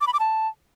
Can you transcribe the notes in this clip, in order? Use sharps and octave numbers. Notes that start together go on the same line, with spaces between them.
D6
B5
D6
A5